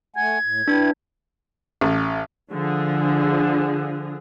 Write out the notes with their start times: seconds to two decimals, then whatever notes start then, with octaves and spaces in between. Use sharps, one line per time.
0.16 A3 F#5 G#5 G#6
0.43 A2
0.68 D4 E4 G4 B4
1.81 A1
2.51 D3 F3 G#4